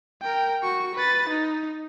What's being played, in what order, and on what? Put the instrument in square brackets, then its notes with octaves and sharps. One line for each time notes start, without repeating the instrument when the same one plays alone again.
[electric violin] A#4 G5
F#4 C#6
B4 A6
D#4